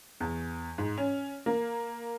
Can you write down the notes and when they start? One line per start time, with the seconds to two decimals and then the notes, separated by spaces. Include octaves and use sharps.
0.20 E2
0.78 G#2
0.98 C#4
1.46 A#3